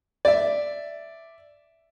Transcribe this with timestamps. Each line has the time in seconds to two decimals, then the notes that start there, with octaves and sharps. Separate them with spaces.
0.25 D5 E5